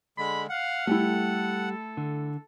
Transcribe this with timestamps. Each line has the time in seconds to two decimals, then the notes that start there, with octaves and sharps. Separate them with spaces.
0.18 D3 G#3 B5
0.50 F5 F#5
0.87 G3 A3 E4 G4 A4
1.97 D3